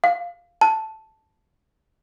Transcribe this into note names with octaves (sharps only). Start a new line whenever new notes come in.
F5
A5